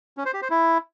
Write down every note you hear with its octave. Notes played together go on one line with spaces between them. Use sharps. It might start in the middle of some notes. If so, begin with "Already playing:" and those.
C#4
C5
G4
C5
E4